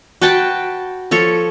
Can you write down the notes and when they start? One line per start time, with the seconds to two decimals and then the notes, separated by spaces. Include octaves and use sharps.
0.22 F#4 B4 G5 A5
1.11 F3 A4 C#5